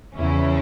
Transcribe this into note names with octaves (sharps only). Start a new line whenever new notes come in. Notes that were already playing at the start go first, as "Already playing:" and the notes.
E2 C#3 F3 C#4 E4